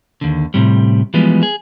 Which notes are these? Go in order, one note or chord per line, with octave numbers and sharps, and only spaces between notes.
D#2 D3
A2 C3 G3
E3 F3 G3 G#3 B3
G#4